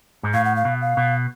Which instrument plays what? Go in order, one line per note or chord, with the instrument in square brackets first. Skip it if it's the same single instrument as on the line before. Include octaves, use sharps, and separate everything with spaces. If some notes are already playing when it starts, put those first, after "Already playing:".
[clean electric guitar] G#2
[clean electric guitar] A2 [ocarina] F5
[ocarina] F#5
F5
[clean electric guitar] B2
[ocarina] F5
[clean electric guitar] B2